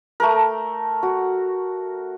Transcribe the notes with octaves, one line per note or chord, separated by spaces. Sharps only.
A3 A4 A#4
F#4